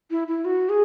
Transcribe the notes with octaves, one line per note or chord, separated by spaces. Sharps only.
E4
E4
F#4
G#4